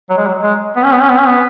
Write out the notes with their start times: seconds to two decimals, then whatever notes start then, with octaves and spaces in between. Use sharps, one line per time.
0.10 F#3
0.18 G#3
0.26 F#3
0.43 G#3
0.76 B3
0.84 C#4
0.93 B3
1.01 C#4
1.10 B3
1.19 C#4
1.27 B3